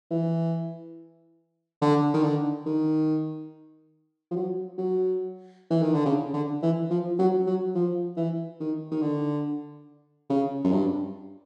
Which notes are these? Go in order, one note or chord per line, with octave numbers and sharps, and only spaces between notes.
E3
D3
D#3
D3
D#3
F3
F#3
F#3
E3
D#3
D3
C#3
D3
E3
F3
F#3
F#3
F3
E3
D#3
D#3
D3
C#3
F#2
G2